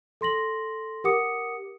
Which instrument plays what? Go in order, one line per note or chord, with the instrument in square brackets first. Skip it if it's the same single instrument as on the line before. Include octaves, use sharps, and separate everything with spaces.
[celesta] A4 C6 A#6 F#7
G4 A#4 F#5 D6 D#6 C#7